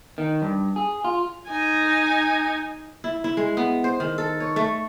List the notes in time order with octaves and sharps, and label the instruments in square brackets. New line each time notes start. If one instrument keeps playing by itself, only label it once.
[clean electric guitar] D#3
G2
G#4
F4
[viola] D#4 G#5
[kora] E4
E4
G#3
B3
C5
D#3
A4
C#5
A3